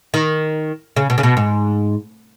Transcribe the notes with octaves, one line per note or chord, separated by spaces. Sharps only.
D#3
C#3
B2
C#3
B2
G#2